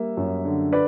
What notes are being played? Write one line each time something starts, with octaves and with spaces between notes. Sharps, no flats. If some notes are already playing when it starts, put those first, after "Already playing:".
Already playing: G3 A#3 E5
F#2
D3
B4 D5